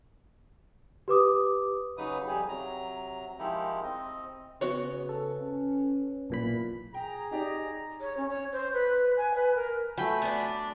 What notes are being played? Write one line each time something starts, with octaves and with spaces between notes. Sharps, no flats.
G4 B4 D6 D#6
C#3 F#3 D#4 B4 D#6
F2 G3 G4 G#4
C3 F#3 A#5
D#3 F3 G#3 D#4 E4 G4
C4 D#5
C#3 B3 F#4 C#5
A4
C#4
B1 A#2 E3 B5
G#4 G5 A#5
D#4 G4 D5
C#5
C#4
C#5
C5
B4
G#5
B4
A#4
F#3 A3 G5 G#5 B5
B3 D4